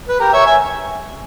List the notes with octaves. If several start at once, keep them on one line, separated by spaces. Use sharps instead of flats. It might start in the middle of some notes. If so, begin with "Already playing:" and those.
B4
G4 A#4
C#5 E5
E5 G#5